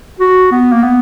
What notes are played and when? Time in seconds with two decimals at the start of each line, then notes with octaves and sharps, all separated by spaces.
0.20 F#4
0.52 B3
0.72 A#3
0.83 B3